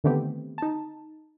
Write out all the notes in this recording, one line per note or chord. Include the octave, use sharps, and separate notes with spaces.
D3 D#3 A3 B3 C4 G4
D#4 A5